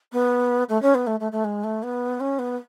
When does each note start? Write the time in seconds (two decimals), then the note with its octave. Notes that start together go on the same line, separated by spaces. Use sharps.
0.12 B3
0.69 A3
0.82 C#4
0.94 B3
1.06 A3
1.20 A3
1.32 A3
1.44 G#3
1.63 A3
1.82 B3
2.20 C#4
2.38 B3